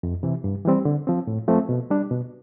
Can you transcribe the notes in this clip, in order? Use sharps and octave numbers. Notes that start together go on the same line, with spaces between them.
F2
C3 E3
G2
E3 G3 C4
D3
F3 C4
A2
F3 A3 C4
B2
G3 D4
B2